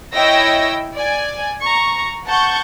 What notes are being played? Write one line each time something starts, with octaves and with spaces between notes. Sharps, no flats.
E4 C#5 D#5 G5 E6 A#6
D5 G#5
A#5 C#6
F#5 A5 C#6 G6